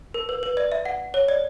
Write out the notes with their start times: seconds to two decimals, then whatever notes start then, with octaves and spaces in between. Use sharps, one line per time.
0.14 A#4
0.29 B4
0.43 B4
0.57 D5
0.72 E5
0.85 F#5
1.14 C#5
1.28 D5